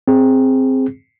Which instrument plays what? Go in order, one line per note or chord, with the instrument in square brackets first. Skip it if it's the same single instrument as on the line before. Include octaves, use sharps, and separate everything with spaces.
[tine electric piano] C4 G#4